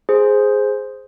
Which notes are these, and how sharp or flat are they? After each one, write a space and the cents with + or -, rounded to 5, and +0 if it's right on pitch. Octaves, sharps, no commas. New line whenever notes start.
G#4 +0 C5 +0